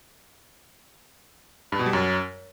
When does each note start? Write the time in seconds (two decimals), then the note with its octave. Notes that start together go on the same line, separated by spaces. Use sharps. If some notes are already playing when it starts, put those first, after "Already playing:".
1.72 G2
1.79 B2
1.86 G3
1.93 F#2